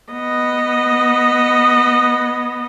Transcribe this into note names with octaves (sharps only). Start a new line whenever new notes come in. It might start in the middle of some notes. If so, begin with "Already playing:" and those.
B3 D#5